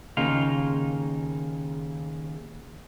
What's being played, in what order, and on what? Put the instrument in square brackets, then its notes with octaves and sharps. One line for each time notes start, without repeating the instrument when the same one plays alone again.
[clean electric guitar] D#2 C#3 A#3 D#4 F4 F5